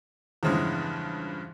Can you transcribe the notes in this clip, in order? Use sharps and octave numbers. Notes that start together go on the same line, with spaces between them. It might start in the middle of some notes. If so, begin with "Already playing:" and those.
E2 G2 C#3 F3 G#3